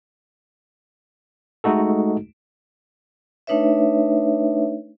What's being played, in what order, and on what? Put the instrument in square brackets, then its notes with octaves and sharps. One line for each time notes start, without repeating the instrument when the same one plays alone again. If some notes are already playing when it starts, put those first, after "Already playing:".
[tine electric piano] G#3 A3 D#4 F#4 A4
[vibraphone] A3 D4 D#4 B4 C#5 E5